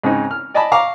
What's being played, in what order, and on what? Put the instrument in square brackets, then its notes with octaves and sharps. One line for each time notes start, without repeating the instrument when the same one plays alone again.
[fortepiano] G#2 C#3 C4 D#4
F6
D5 D#5 G#5 A5 B5
F5 A#5 C#6 D6